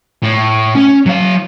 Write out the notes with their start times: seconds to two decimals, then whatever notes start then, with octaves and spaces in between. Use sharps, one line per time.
0.23 A2
0.75 C#4
1.06 F#3 F5